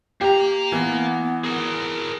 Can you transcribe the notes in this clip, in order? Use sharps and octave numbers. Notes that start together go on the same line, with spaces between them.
A#3 G4 A#5
E3 B3
G#4 A#4